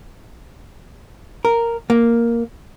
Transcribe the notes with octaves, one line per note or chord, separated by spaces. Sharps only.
A#4
A#3